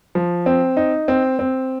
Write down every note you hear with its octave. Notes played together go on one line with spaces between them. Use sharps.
F3
C4
D#4
C4
C4